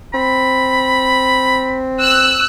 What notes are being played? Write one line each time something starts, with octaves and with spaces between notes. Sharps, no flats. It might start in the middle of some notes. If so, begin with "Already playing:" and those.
C4 B5
E6 F#6